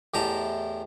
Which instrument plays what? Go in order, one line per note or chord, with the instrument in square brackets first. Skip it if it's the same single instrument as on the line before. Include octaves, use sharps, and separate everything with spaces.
[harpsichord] E2 A2 G4 D#5 A5 A#5